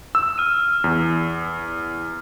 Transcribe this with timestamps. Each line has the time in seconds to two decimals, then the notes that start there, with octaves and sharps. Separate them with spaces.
0.15 E6
0.38 F6 D#7
0.84 E2